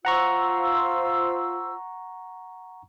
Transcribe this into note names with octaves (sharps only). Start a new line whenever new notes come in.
F4 C5 F#5 A#5 C#6 E6